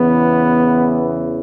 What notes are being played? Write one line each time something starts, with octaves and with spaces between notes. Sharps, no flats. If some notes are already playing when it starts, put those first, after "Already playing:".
Already playing: E2 C#3 E3 B3